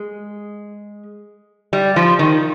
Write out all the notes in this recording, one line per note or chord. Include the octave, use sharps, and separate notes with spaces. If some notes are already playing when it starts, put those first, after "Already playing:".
Already playing: G#3
G3
F3
D#3